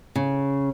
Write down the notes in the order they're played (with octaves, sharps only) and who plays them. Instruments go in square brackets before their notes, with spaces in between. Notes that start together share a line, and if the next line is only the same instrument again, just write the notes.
[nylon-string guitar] C#3